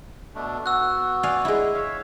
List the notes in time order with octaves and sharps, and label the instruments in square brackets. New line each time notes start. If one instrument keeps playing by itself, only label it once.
[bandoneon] B2 A3 D4
[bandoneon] B3 F#4 [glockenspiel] E6 F#6
[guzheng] D5 F5 G#5
G#3 E4
[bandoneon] C#5 E5 F5